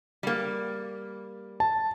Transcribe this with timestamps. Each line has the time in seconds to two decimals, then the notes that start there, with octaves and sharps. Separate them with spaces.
0.23 G3 A#3
1.60 A5